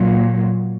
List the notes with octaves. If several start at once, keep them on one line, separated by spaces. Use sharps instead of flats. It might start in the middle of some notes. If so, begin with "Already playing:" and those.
Already playing: A#2 F#3